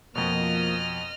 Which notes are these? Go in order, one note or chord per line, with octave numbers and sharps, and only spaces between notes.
F2 B2 F3 A#3 D#5 F6